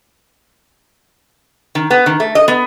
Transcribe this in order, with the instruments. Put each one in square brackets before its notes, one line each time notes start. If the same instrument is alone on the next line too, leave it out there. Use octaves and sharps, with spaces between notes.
[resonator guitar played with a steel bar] D#3
B3
D#3
A3
D#5
B3